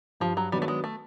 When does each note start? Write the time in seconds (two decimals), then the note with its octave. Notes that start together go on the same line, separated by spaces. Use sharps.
0.20 G2 F3
0.37 F#3
0.52 D#3 F#3 G3 B3 D4
0.62 A3
0.68 G#3
0.84 A3